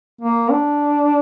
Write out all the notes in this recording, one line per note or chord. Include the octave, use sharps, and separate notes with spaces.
A#3
D4